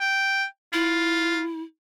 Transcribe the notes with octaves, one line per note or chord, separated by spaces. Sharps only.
G5
E4 F4